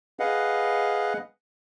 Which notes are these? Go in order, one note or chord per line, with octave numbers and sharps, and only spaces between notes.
G#4 B4 D#5 F5 F#5